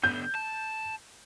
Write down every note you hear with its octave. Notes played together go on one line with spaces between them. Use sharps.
D3 B3 G6
A5